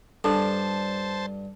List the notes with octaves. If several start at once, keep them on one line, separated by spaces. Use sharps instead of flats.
G2 D4 A4 C5 A5